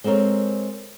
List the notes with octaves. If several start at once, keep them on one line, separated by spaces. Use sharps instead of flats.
G#3 C4 A4 A#4 C#5